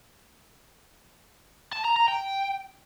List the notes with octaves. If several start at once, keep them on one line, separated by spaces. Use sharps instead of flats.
A5
A#5
A#5
G5